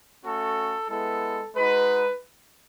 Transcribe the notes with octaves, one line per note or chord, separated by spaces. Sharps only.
A3 C#4 F#4 A4
G#3 B3 E4 A4
G#3 D#4 F#4 B4